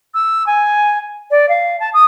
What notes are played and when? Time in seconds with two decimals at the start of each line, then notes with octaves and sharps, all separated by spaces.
0.14 E6
0.46 G#5
1.30 D5
1.48 F5
1.79 A5
1.93 D#6